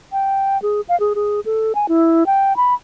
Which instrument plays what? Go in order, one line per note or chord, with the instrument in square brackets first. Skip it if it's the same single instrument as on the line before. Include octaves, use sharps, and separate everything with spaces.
[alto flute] G5
G#4
F5
G#4
G#4
A4
G#5
E4
G5
B5